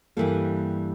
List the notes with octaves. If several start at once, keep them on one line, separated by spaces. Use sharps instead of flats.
G2 E3 G3 A#3 A4